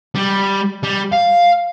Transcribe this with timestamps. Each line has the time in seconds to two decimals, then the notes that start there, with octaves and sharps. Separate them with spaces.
0.15 G3
0.83 G3
1.12 F5